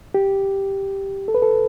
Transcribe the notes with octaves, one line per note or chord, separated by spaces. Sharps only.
G4
A4
B4
A4